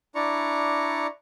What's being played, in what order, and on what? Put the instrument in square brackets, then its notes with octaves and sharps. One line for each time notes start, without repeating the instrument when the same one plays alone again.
[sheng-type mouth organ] D4 E4 D5 A#5 C#6